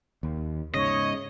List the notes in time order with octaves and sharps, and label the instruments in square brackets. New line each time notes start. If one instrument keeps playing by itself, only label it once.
[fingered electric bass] D#2
[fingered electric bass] G#2 C#3 [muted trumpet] C#5 [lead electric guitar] D#5